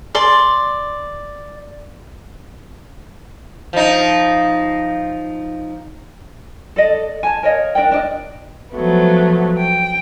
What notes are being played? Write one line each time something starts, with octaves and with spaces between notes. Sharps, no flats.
D5 C6
F3 D#4
A4 D5 D#5
G#5 A5
A#4 C#5 D#5 F5
D4 A#4 D5 G5
D4 D5 D#5
F3 F#3 A3 B3
G5